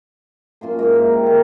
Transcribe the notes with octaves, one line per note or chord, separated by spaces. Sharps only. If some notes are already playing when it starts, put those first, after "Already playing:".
F#2 A#2 F4 C6
G#2 E5 F5
A#4
G4
A#3